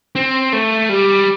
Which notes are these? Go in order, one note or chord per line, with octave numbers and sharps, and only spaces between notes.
C4
A3
G3